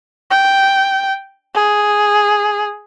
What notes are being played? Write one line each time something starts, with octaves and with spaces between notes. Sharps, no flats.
G5
G#4